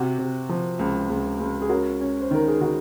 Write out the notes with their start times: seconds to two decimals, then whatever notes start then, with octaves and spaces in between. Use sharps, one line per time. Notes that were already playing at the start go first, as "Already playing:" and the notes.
Already playing: C3 F#4
0.18 C3
0.49 F3
0.79 C#2
1.10 C#2
1.40 C#2
1.62 G#4
1.69 C#4 F#4 A#4
2.01 C#4
2.21 C5
2.31 D#3 A#4
2.48 G#4
2.61 D#3 F#4